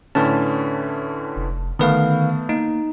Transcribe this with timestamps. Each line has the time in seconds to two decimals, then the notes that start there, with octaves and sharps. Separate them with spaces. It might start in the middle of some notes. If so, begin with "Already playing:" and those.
0.15 A2 D3 C#4 B4 A5
1.36 F1
1.79 D3 D#3 A3 B3 B4 F5
2.49 A#3 D#4